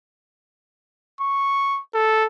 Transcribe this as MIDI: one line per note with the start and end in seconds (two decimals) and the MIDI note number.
1.21 1.79 85
1.94 2.26 69